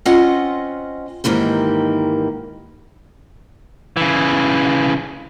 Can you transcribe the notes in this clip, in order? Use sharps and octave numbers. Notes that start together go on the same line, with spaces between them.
C4 C#4 F4 D#5 F#5
G#2 D#3 E3 A#3 G4
C#3 E3